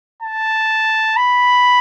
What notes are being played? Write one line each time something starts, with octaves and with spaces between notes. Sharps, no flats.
A5
B5